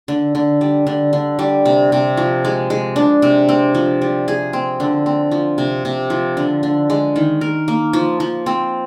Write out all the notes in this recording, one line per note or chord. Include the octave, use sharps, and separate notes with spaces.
D3
D3
G3
D3
D3
G3
C3
C3
F3
G#3
G#3
D4
C3
C4
F3
G3
G#4
C4
D3
C4
F3
C3
C3
F3
D3
D3
G#3
D#3
A#4
A#3
F3
F3
C4